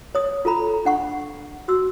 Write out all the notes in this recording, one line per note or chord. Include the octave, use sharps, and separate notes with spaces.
C#5 D#6
F4 A4 A#5 B5
D4 F#5 C#6
F#4 C6 E6